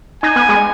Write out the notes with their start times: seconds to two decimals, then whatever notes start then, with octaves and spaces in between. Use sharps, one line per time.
0.23 D#4 G#5
0.36 B3
0.49 G#3